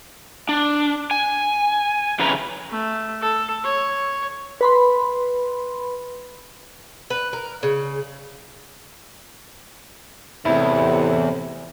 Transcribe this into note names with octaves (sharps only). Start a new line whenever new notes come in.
D4
G#5
F2 C#3 C#4 E4 B4 A#5
A3
A4
C#5
B4 B5 C6
B4
A#4
C#3
E2 A2 C3 E4